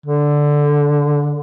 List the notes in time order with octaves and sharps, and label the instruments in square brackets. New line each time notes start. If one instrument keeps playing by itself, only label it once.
[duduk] D3